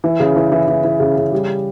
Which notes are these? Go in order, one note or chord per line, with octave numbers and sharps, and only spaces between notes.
E3
C#3
E3
E3
E3
E3
C#3
C#3
G3